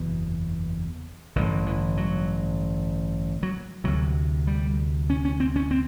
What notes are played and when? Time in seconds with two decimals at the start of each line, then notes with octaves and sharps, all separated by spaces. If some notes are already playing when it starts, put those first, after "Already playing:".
Already playing: F#1 E2 B2
1.36 A1 G2 D3 D#3
1.66 E3
1.97 F#3
3.43 F#3
3.84 D2 C3 F#3
4.47 G3
5.10 C#4
5.25 C#4
5.40 C4
5.56 C#4
5.71 C4